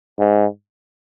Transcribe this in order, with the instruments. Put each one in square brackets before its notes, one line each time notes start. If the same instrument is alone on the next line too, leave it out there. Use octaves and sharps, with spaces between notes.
[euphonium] G#2